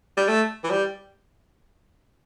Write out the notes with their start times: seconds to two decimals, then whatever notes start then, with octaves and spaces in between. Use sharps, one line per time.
0.17 G3
0.28 A3
0.64 E3
0.70 G3